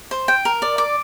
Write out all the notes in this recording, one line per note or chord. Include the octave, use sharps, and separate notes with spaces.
C5
G5
A#4
D5
D6